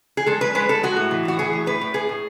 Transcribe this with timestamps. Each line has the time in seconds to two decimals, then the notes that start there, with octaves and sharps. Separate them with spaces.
0.17 G#4
0.26 G#3 A4
0.41 G#3 B4
0.55 G#3 B4
0.69 G#3 A4
0.83 G#3 F#4
0.97 A2
1.11 E3
1.25 A2 F#4
1.39 E3 G#4
1.53 A2
1.66 A2 B4
1.81 A2
1.94 A2 G#4
2.09 A2